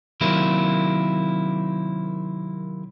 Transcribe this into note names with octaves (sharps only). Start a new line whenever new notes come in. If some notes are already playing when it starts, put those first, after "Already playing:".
C3 D#3 F#3 A#3 E4